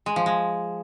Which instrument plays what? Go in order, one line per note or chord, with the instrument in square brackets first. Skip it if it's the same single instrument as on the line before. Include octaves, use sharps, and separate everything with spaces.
[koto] G#3
F3
G#3